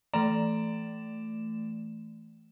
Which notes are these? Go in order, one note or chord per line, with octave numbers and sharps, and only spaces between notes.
E3 A3 D5 A#5 E7